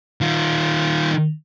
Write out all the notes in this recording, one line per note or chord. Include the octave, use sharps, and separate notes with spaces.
D#3 F4